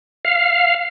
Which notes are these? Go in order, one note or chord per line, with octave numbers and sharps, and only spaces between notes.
F5